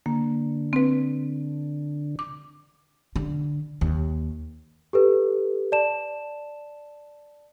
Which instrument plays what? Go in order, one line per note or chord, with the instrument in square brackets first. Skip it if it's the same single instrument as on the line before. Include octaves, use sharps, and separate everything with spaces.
[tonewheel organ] D3 [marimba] A#3
[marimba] C4 B4
D6
[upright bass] D3
D#2
[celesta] G4 A4 B4
D5 A5 E7